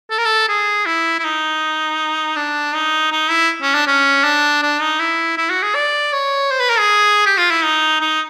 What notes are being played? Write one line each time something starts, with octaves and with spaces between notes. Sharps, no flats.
A4
A#4
A4
G#4
E4
E4
D#4
D4
D#4
D#4
E4
C#4
D4
C#4
D4
D4
D#4
E4
E4
F#4
G#4
D5
C#5
C5
B4
A#4
G#4
G4
F4
E4
D#4
D#4